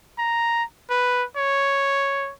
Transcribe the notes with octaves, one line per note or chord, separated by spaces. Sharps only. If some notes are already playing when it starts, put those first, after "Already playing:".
A#5
B4
C#5